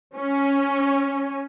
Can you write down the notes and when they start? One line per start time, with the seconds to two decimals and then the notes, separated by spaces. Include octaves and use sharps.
0.16 C#4